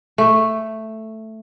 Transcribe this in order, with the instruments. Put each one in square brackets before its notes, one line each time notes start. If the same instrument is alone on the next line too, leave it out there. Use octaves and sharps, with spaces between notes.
[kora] A3